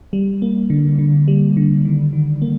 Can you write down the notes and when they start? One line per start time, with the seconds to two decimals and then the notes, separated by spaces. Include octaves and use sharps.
0.13 G3
0.42 A#3
0.70 D3
0.99 D3
1.28 G3
1.57 D3
1.85 D#3
2.13 D#3
2.42 A#3